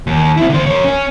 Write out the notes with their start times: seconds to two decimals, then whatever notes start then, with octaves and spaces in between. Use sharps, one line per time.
0.07 D#2
0.37 C4 E4
0.50 D3 C5
0.66 A#4 C#5
0.84 C#4